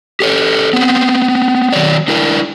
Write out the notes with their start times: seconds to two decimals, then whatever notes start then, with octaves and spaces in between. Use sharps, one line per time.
0.20 G4 A4 C#5
0.73 B3 C4
1.73 D#3 F#3 C#5 D5
2.08 D4 E4 A#4